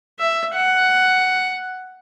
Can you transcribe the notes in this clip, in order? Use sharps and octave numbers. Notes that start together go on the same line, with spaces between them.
E5
F#5